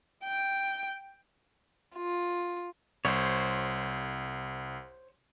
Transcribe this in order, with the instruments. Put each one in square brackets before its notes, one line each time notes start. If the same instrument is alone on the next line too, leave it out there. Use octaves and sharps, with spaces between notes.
[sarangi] G5
[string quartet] F4
[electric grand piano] C2 [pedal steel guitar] C5 C#5